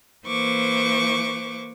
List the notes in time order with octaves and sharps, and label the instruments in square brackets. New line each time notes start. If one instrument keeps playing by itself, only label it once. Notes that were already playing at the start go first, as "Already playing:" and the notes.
[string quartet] E3 A#3 C5 C#6 D6